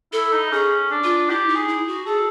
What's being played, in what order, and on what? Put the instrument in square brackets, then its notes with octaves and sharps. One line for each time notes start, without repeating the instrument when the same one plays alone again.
[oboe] E4 [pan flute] A4
[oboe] D#4
[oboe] C#4 [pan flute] G#4
[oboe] D4
[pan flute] F4
[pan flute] E4 [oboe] G4
[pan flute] D#4
[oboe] G#4
[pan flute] E4
F#4
[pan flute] G#4 [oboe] A4